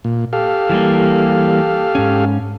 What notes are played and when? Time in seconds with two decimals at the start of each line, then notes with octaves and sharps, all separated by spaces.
0.04 A#2
0.33 G4 A4 F5
0.70 E3 G3 A#3
1.95 G#2 C#4